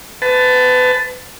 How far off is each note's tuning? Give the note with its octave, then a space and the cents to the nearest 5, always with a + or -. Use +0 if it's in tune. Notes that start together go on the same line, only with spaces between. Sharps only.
B4 +30 A5 +0